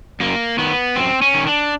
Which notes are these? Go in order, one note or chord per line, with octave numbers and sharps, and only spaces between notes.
F#2 A#3
D#3 B3
F#2 C4
C#4
D#3
D4